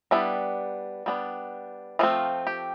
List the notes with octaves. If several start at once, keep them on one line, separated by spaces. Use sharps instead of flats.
G3 B3 D4 E4
G3 B3 D4
F3 A3 C4 F4
G4